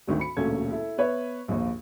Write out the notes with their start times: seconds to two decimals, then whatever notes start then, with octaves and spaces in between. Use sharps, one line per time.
0.07 G#1 D2 D#3
0.20 B5 C#7
0.37 E1 D2 A#2 C#4 A4 G#6
0.71 E4 A4
0.98 B3 B4 C#5 E5
1.48 A#1 D#2